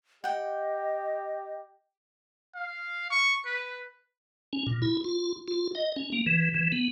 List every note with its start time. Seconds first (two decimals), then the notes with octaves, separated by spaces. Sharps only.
0.24 G4 D#5 F#5 G5
2.55 F5
3.11 C#6
3.46 B4
4.53 C#4
4.66 A#2
4.82 E4
5.04 F4
5.48 F4
5.75 D#5
5.96 C#4
6.12 A#3
6.26 E3
6.54 E3
6.72 B3